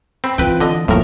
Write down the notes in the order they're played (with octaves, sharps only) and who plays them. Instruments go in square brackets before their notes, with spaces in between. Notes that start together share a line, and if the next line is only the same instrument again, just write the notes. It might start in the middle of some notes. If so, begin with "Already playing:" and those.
[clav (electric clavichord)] C4 [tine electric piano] B5
[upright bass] E3 [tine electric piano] C4 F4 [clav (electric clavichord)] B4 G5
[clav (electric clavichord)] D3 D#5
[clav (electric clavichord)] A2 A#4 [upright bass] E3 B3 [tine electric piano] F3 A#3